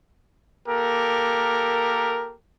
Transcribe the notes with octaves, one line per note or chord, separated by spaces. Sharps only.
A#3 G4 A4 A#4